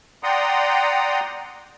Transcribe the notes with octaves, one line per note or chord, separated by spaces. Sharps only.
D5 F#5 G5 A#5 C6 D#6